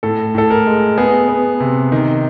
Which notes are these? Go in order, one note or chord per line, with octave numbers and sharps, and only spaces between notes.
A2 A4
A2 A4
A#4
G#3
B3 G#4
B3
C3
D#3